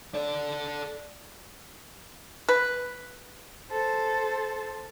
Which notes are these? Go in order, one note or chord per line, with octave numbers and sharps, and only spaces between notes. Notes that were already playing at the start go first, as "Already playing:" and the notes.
A4 D5
B4
A4 C5